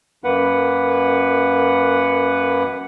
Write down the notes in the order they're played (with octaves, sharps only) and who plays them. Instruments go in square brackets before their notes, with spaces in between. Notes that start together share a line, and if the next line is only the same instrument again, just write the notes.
[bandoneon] F#2 A#3 B4 F#5